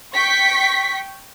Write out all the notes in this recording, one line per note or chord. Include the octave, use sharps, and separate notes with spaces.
G5 C#6 B6